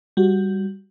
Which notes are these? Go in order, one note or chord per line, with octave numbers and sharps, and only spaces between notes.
G3 F#4